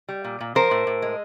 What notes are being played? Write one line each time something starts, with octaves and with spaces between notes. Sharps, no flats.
G3
A#2
A#2
F3 A#4 C5
A2
A2
G#3